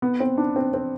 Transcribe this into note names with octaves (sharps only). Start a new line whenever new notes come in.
B3
C4
D4
C4
C4